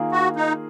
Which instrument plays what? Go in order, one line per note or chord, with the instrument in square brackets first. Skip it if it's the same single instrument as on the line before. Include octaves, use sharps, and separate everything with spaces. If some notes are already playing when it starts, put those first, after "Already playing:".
Already playing: [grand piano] D#3 A#3 F4 G#4
[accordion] F#4
D#4